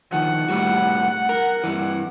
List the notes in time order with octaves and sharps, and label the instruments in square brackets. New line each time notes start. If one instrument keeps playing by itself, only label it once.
[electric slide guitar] D#3 F3 [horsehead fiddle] F#5
[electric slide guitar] A2 G3 F#4
A#4
G2 E3